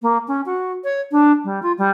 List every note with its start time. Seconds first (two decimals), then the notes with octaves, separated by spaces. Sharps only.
0.02 A#3
0.28 C#4
0.46 F#4
0.84 C#5
1.11 D4
1.44 G3
1.63 F4
1.78 G3